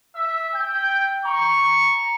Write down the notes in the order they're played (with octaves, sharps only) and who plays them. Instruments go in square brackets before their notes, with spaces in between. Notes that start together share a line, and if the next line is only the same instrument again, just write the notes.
[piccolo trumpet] E5 [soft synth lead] E6
[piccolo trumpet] G5 [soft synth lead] G6
[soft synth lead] A#5 [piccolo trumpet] C#6